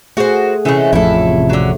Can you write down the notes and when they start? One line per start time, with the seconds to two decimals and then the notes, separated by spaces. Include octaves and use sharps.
0.17 A3 F#4 G#4 A#4 C5 F#5
0.65 C3 E3 G#3 A3 C#4
0.93 A1 F2 F3 A3 E4 A4
1.50 D3 F#3